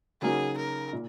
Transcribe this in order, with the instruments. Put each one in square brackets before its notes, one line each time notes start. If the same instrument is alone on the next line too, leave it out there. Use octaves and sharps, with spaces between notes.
[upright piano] C#3 F#3 A#3 D#4 F#4 [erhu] G#4
[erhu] A#4
[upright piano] A#2